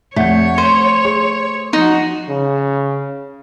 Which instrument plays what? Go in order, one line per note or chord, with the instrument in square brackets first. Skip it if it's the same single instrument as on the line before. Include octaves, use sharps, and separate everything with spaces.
[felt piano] F1 F#5 G6 [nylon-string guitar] A3 [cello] C#5
[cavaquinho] C5 [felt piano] D#7
[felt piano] G#4 C6
[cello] F3 F#4 [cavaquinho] D#4
[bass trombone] C#3